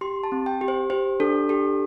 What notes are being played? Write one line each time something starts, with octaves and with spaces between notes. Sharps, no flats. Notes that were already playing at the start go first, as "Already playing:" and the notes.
G4 C6
A5
C4
G5
G4
C5
G4 C5
D4 A4
G4 A4